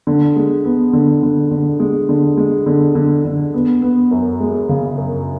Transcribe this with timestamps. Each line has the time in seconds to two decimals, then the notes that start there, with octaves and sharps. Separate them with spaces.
0.07 D3
0.36 G#3
0.65 B3
0.93 D3
1.23 D3
1.51 D3
1.80 G#3
2.09 D3
2.37 G#3
2.66 D3
2.95 D3
3.25 D3
3.54 B3
3.82 B3
4.11 F#2
4.40 G#3
4.69 C#3
4.97 F#2